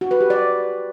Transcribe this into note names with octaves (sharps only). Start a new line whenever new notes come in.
F#4
B4
G4
D5